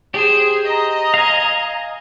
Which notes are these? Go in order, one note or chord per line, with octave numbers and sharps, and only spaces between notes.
G4 G#4 C5
D#5 A#5
F5 G#5